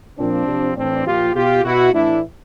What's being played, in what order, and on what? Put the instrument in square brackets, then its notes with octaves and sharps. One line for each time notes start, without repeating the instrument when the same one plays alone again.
[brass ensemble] A#2 F3 C4 D4
C3 F3
A2 E3 C4 D4
A#2 F3 F4 G4
B2 F4 G4
B2 E4 F#4
A2 E3 D4 E4